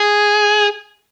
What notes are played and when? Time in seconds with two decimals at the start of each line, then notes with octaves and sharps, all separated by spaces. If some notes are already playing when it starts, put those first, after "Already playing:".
Already playing: G#4